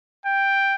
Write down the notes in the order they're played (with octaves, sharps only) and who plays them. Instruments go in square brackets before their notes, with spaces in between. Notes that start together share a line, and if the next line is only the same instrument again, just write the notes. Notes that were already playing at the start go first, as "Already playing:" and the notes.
[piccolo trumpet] G5